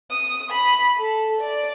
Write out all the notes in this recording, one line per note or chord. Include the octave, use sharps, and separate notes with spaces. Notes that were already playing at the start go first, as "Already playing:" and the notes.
D#6
B5
A4
D5